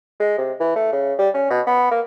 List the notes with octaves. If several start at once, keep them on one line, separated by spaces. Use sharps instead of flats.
G#3
C3
E3
A3
C#3
G3
C#4
B2
B3
A#3